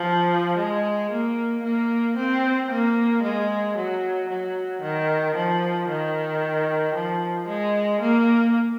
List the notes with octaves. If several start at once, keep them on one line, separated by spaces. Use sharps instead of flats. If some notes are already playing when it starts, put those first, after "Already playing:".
Already playing: F3
G#3
A#3
A#3
C4
A#3
G#3
F#3
F#3
D#3
F3
D#3
F3
G#3
A#3